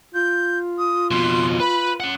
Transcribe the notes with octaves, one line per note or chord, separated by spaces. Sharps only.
F4 G6
D#6
F2 B2 C6
B4 B5
C#4 F#5